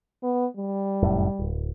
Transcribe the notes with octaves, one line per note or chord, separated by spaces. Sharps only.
B3
G3
F1 F#2 A2
D1